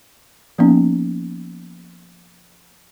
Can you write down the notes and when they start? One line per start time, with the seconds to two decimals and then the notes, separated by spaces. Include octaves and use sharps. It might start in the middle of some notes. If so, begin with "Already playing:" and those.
0.58 F3 A#3 B3 C#4 D#4